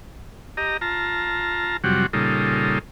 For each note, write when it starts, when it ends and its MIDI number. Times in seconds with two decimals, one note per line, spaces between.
0.57 0.77 67
0.57 0.77 75
0.57 0.77 82
0.81 1.77 65
0.81 1.77 81
0.81 1.77 82
1.84 2.06 41
1.84 2.06 48
1.84 2.06 54
1.84 2.06 55
1.84 2.06 66
2.13 2.79 46
2.13 2.79 49
2.13 2.79 55
2.13 2.79 63
2.13 2.79 65
2.13 2.79 69